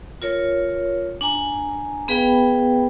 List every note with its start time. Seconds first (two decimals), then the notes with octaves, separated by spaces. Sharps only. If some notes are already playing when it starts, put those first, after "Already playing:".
0.22 F4 A#4 C#5
1.21 D4 G#5 A#5
2.08 B3 G#4 B4 F5 G5 B5